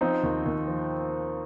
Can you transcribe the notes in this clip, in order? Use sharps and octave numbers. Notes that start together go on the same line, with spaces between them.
F3 C4 D#4
D#2
D#2
F3